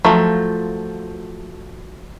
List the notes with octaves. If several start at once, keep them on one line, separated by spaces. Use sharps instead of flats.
F3 F#3 A3 F4